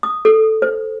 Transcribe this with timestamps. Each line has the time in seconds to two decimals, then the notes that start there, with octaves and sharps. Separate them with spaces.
0.03 D#6
0.25 A4
0.62 C5